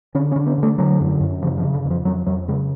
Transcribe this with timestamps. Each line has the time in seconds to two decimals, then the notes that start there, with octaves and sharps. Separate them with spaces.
0.15 D3 C#4
0.32 C#4
0.36 D3
0.46 B3
0.58 D3
0.63 A3
0.78 D3 F#3
1.00 F#2
1.20 F#2
1.42 C#3 F3
1.58 F3
1.63 C#3
1.74 D3
1.85 F2
1.90 F3
2.05 F2 F#3
2.27 F2 F#3
2.48 C#3 G#3